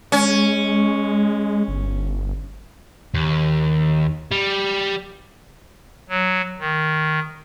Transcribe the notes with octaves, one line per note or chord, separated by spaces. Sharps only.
G#3 C#4
G1
D#2
G3
F#3
D#3